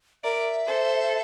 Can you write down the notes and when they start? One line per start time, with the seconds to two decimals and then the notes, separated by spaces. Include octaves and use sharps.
0.23 A#4 D5 E5
0.67 A4 C5